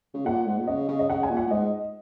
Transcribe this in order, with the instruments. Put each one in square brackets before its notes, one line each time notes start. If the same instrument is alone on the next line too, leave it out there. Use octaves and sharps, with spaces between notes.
[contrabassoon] C#3
[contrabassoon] A#2 [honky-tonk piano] F#5
[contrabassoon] G#2
A#2
[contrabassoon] C#3 [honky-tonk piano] D#5
[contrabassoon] C#3
[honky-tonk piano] D#5
[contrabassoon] C#3 [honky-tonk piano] F#5
[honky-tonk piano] G#5
[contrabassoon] A#2
[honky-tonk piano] F#5
[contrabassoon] A#2
[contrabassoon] G#2 [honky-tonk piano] D#5